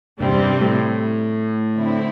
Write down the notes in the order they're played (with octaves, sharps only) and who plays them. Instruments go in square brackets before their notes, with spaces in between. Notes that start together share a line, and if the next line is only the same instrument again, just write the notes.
[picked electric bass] G2 [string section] C3 G3 C4
[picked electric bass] E2
G2
A2
[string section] D3 C4 E4